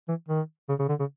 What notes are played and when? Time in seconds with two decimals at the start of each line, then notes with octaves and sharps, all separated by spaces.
0.08 E3
0.29 D#3
0.69 C#3
0.79 C#3
0.89 D3
1.00 C#3